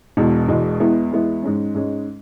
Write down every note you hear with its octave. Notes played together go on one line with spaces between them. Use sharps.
E1 E2 B2 G#3
E1 E2 B2 G#3
E2 E3 G#3 B3 E4
E2 E3 G#3 B3 E4
G#2 G#3 C#4
G#2 G#3 C#4